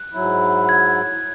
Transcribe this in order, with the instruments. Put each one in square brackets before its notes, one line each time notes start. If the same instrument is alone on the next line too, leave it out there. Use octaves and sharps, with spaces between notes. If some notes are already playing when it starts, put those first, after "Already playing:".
Already playing: [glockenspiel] F#6
[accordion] G#2 F#3 E4
[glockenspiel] G#6